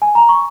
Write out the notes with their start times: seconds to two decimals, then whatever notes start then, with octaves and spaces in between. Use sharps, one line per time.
0.02 G#5
0.15 A#5
0.29 C#6